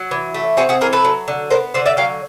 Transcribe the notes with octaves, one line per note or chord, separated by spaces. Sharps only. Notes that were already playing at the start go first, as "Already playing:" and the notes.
Already playing: F#3
E3
A3
C4 F#4 G#4
F#4 G#4
E3 G#4 A#4
A4 B4
F#3
D3
B3 A#4 C5
D3 C5 D5
D5 E5
F#3 F5 G5